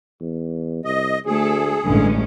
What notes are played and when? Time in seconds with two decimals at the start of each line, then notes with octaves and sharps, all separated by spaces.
0.21 E2
0.85 C2 D#5
1.26 D2 A3 G#4 A4
1.84 A1 G2 D3 G#3 C#4